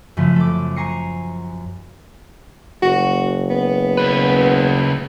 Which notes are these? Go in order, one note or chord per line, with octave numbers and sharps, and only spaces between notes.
F#2 C#3 F3 A3
A4 D6
G#5 A#5 C#6 A#6 C7 C#7
F#1 F#4
B3
C#3 B4